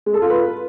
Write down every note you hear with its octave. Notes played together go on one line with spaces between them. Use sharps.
G#3
A4
F4
B4